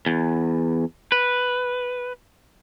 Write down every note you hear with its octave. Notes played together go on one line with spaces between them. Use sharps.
E2
B4